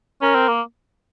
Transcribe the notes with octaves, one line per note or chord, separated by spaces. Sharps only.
C#4 A#4
C4
A#3